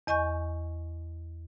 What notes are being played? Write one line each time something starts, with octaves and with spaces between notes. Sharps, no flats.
E2 D#5 G#5 C#6 G6